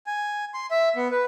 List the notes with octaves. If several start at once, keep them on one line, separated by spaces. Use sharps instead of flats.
G#5
C6
E5
B3
B4